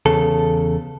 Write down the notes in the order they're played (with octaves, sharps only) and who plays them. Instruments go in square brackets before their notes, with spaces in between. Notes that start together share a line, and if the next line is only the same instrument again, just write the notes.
[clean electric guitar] E2 C#3 A4